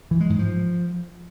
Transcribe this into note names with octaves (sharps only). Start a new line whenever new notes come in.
E3
G#3
G#2
F3